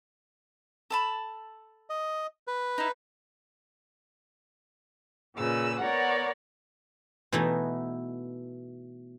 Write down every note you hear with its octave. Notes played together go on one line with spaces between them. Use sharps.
A4 A5 B5
D#5
B4
D#4 E4
A#2 C#3 B4 E6
B3 A#4 C#5 D5 F#5
B2 E3 A3 B3 D#4 E4